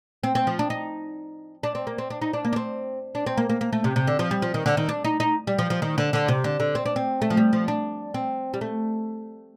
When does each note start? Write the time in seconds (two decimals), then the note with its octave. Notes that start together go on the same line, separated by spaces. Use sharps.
0.23 C4
0.35 C4
0.47 F3
0.59 D4
0.70 D#4
1.63 D4
1.75 C4
1.87 A#3
1.98 C4
2.10 D4
2.21 D#4
2.33 D4
2.45 A#3
2.53 D4
2.56 C4
3.15 D4
3.26 C4
3.37 A#3
3.49 A#3
3.61 A#3
3.73 A3
3.84 C3
3.96 C3
4.07 D3
4.19 F3
4.31 G3
4.42 F3
4.54 D#3
4.66 D3
4.77 D#3
4.89 D4
5.05 D#4
5.20 D#4
5.47 G3
5.59 F3
5.70 F3
5.82 D#3
5.98 D3
6.13 D3
6.28 C3
6.44 D3
6.60 D3
6.75 C4
6.86 D4
6.96 C4
7.22 A3
7.30 F3
7.37 G3
7.53 F3
7.68 D4
8.14 C4
8.54 G3
8.61 A3